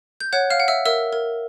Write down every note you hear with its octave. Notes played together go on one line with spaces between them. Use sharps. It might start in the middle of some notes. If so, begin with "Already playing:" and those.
G6
C#5 F#5 F#6
F5 F6
F#5
E5 E6
A#4 E5 E6
A#4